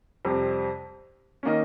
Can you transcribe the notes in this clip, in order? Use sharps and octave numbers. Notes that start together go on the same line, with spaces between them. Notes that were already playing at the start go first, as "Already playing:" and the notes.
F2 C3 G3 C4
D#3 A#3 C#4 D#5